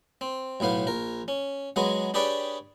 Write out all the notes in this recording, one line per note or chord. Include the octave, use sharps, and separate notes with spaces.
C4
B1 A2 B3 F5
A#1 A#4
C#4
F#3 G#3 B3 G#4
D4 G4 G#4 B4 C#5 D5